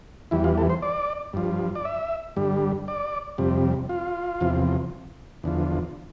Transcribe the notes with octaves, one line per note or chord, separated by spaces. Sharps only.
E2 E3 G3 E4
F4
A4
C5
D5
G2 F3
D5
E5
G2 D3 G3
D5
F2 C3 G3
F4
E2 C3 F3
E2 D3 F3